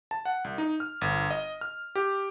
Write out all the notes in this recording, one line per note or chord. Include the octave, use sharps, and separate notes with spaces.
A5
F#5
C2
D#4
F6
G1
D#5
F6
G4